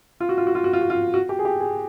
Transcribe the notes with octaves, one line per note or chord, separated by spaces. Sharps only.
F4
F#4
F4
F#4
F4
F#4
F4
F#4
F4
F#4
G4
G#4
G4
G#4